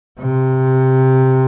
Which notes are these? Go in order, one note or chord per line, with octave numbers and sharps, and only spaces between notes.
C3